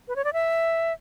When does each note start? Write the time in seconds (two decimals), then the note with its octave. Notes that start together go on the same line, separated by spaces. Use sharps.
0.08 B4
0.16 C#5
0.24 D5
0.33 E5